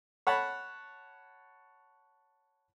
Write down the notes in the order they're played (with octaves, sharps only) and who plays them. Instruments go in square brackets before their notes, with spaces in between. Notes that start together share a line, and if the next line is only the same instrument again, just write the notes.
[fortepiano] C#5 F#5 A5 B5